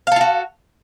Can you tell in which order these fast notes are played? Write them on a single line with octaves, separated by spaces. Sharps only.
F5 A4 F4 F#4